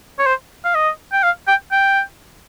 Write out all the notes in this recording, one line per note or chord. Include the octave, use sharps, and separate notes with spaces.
C#5
C5
F5
D#5
G5
F5
G5
G5